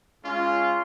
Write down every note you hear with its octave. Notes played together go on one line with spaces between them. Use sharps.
G#3 C#4 F4